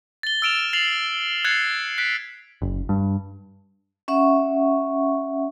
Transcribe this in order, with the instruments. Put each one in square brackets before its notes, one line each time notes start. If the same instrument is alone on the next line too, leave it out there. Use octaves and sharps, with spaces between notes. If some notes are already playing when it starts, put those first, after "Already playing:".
[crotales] A6 G7
E6 F6 D7 E7 F7
A6 C7 F7 F#7
F#6 G#6 A6 C7 C#7 F7
F#6 B6 D7
[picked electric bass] F#1
G2
[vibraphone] C#4 E5 F#5 C#6